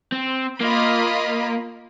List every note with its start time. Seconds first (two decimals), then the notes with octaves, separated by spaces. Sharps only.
0.12 C4
0.61 A#3 F4 D#5 B5